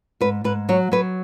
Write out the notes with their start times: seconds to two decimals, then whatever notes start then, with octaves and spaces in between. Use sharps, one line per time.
0.21 G#2 B4
0.44 G#2 B4
0.69 F#3 C#5
0.92 F#3 B4